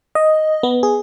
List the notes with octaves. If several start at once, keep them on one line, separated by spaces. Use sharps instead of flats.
D#5
B3
G#4